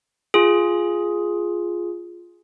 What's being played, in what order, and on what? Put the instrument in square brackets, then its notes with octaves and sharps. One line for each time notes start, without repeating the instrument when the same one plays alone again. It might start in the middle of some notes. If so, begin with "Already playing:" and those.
[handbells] F4 G#4